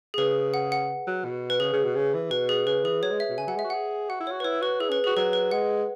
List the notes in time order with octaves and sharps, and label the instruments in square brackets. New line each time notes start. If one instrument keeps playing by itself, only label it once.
[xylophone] G#4
[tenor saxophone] C#3 [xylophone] B4
[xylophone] F#5
F#5
[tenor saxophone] F#3
B2
[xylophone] B4
[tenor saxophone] C#3 [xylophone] G#4
[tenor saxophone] C#3
B2
C#3
E3
[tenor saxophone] B2 [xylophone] B4
[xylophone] G#4
[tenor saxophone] C#3 [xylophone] B4
[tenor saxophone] E3 [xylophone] G#4
[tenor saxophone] F#3 [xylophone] C#5
[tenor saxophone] G#3
[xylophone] E5
[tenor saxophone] B2
[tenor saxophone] C#3 [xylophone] G#5
[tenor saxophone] F#3 [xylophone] F#5
[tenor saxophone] G#3 [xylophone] E5
[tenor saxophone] F#4
[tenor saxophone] G#4 [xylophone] F#5
[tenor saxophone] F#4 [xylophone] F#5
[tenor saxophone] E4
[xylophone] C#5
[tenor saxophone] F#4
[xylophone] B4
[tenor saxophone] E4 [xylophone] C#5
[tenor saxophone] F#4 [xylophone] B4
[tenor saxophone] E4 [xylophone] G#4
[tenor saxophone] C#4 [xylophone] B4
[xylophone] G#4
[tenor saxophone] F#4
[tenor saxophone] F#3 [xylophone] B4
[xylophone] B4
[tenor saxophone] G#3 [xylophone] F#5